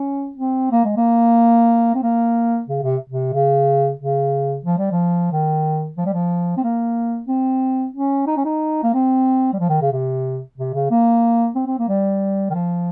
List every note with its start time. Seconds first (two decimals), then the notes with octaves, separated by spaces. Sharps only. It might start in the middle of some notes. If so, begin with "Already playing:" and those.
Already playing: C#4
0.37 C4
0.71 A#3
0.84 G#3
0.97 A#3
1.95 C4
2.03 A#3
2.68 C#3
2.82 C3
3.09 C3
3.33 C#3
3.99 C#3
4.65 F3
4.78 G3
4.91 F3
5.32 D#3
5.97 F3
6.05 G3
6.13 F3
6.57 C4
6.63 A#3
7.28 C4
7.94 C#4
8.27 D#4
8.36 C#4
8.45 D#4
8.83 A#3
8.93 C4
9.53 G3
9.59 F3
9.69 D#3
9.81 C#3
9.92 C3
10.58 C3
10.74 C#3
10.90 A#3
11.55 C4
11.67 C4
11.78 A#3
11.88 G3
12.50 D#3
12.54 F3